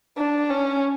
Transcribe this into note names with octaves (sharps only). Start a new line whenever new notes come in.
D4
C#4